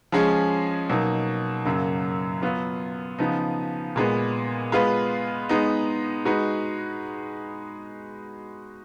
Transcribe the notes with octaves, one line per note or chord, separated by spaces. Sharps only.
F3 G#3 C#4 G#4
B2 F#3 A#3 D#4
F#2 C#3 F#3 A#3
F#3 B3 F4
C#3 F3 B3 D#4
A#2 G#3 B3
G#3 B3 F4 B4
G#3 B3 D#4
G#3 D#4 F#4 B4